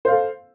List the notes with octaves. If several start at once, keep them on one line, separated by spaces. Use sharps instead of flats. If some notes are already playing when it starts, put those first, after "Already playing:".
A4 C5 F5